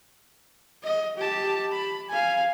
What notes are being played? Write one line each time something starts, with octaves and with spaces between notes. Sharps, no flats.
D#5
G4 A5
B5
F5 G#5